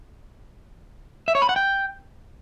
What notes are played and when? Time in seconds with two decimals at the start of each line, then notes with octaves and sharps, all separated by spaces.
1.28 E5
1.35 C#5
1.42 B5
1.49 F#5
1.56 G5